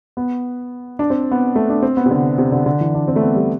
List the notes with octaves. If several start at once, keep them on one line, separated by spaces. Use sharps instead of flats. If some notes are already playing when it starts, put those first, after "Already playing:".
B3
D4
C4
B3
A3
D4
C4
B3
C3
D3
C3
D3
D3
E3
D4
C4
A3
B3
G3